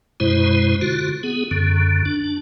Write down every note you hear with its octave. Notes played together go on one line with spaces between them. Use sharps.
F#2 B2 G#3 E4 C5
D3 F4 F#4
B3 G#4
F#2 D3
D4